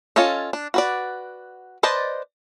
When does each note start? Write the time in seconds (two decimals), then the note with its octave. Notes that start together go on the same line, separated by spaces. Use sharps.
0.16 C#4 F4 A4 C#5 D#5
0.53 D4
0.74 F#4 B4 D5
1.83 B4 C5 D5 D#5 A5